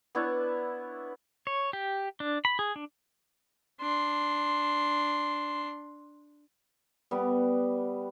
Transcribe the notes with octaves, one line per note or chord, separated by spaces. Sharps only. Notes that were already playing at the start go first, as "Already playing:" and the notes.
B3 D4 E4 C#5
C#5
G4
D4
B5
G#4
D4
D4 C6
G3 B3